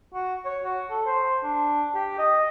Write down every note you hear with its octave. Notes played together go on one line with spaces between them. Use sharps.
F#4
C#5
F#4
A4
C5
D4
G4
D#5